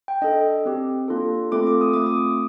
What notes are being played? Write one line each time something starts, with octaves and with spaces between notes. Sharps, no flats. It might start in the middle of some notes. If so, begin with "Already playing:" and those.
G5
D4 A4 D#5
C4 G4
A#3 D4 F4 A4
A3 C4 F4 A4 D6
D6
D#6
A3 C4 F4 D6
D#6